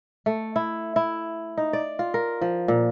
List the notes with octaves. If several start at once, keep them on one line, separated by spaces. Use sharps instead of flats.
A3
E4
E4
D#4
D5
F4
A#4
F3
A#2